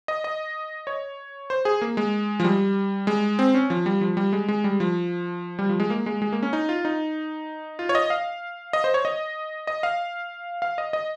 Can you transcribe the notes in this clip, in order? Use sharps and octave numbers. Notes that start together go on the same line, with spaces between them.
D#5
D#5
C#5
C5
G#4
A#3
G#3
F3
G3
G#3
C4
C#4
F3
G3
F3
G3
G#3
G#3
G3
F3
G3
F3
G#3
A#3
G#3
G#3
A#3
C#4
D#4
F4
D#4
F4
C#5
D#5
F5
D#5
C5
C#5
D#5
D#5
F5
F5
D#5
D#5